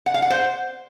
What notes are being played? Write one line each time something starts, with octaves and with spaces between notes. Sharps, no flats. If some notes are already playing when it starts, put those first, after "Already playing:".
F#5
F5
F#5
C5